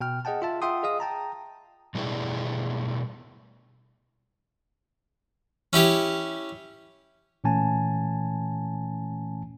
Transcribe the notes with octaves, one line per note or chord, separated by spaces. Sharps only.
B2 G5 F6
G#4 D#5 F#5 G5 A5
F4 E5 A5
F4 E5 F#5 G5 C6 D#6
G#4 D#5 F5 D#6
G5 A5 A#5
B2 G3 A3 D4 E4 G#4
C#4 E4 G4 C#5
A#2 E3 A3 C#4 G#5 A5